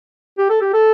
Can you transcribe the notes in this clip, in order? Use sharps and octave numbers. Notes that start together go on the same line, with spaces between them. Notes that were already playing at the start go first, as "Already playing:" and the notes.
G4
A4
G4
A4